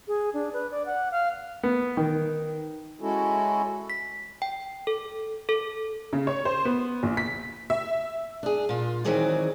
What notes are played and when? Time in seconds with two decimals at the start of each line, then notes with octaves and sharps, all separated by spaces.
0.08 G#4
0.34 D4
0.53 B4
0.71 D5
0.86 F#5
1.11 F5
1.63 B3
1.97 D#3
3.01 G#3 C#4 E4 F#4 A4
3.90 B6
4.42 G5
4.87 A4
5.49 A4
6.13 C#3
6.27 C#5
6.45 C5
6.65 B3
7.03 A#1
7.17 B6
7.70 E5
8.43 D4 G#4
8.69 A#2 F4
9.05 D#3 E3 F#3 C4 G#4 D5